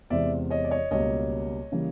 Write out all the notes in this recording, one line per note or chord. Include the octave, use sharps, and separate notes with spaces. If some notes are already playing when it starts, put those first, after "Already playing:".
E2 C3 E3 G#3 D5 E5
C#5 D#5
D5
C#5 D#5
C#2 B2 G3 A#3 C#5 D#5
C#3 E3 G3 A#3